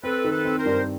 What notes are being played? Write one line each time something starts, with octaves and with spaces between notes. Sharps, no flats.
C4 A4 B4
D#3
A4 B4
C4
A#4 C5
G2